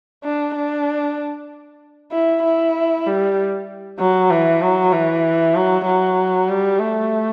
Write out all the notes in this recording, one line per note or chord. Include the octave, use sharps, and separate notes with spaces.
D4
D4
E4
E4
G3
F#3
E3
F#3
E3
F#3
F#3
G3
A3